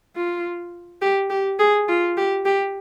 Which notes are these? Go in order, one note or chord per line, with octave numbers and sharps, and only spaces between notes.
F4
G4
G4
G#4
F4
G4
G4